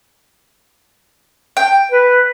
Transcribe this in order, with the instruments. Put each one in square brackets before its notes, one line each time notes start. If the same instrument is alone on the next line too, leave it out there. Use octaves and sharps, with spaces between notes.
[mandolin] G5
[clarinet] B4